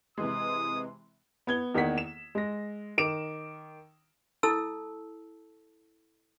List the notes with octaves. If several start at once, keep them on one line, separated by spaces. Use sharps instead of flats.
C3 E3 G#3 D#6
B3 G#6 G7
E2 D#3 A#3 F#5 B6
E7
G#3 A#6
D#3 D6 D7 E7
E4 A4 A5 E6